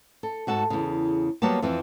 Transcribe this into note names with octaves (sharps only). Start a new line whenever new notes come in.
A4
G#2 F#4 A4 A5
E2 C#3
F#3 G3 A#3 B3 C#5 A5
F2 E3 F3 C4